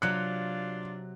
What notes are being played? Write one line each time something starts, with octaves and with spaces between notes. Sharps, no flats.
C3 F#3 D4 F4 F#6 C#7